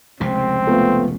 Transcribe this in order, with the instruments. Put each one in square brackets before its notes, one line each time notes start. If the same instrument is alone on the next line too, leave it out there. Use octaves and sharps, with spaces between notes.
[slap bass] F1 C#2 C3 [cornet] C4
[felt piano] A3 B3 F4